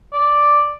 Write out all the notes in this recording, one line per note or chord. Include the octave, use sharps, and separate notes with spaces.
D5